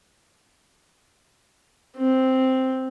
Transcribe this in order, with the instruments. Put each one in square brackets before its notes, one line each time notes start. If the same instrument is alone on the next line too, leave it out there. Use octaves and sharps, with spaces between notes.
[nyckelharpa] C4